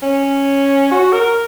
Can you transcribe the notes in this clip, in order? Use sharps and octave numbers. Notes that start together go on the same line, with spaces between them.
C#4
F#4
A#4